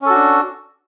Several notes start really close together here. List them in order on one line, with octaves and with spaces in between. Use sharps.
C#4 A4 F#4 D4